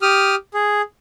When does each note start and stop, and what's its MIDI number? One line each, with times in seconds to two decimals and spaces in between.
0.02 0.35 67
0.02 0.35 87
0.02 0.35 89
0.54 0.82 68